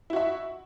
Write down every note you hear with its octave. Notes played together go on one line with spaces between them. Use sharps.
E4 F#4 E5